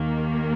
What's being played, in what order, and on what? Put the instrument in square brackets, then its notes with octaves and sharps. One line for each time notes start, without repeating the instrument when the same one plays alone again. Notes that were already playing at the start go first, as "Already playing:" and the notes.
Already playing: [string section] D#2 D#3 A#3